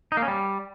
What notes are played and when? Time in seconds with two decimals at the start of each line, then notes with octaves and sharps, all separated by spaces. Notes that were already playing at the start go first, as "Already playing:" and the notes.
0.12 D#4
0.17 A#3
0.22 C#4
0.28 G3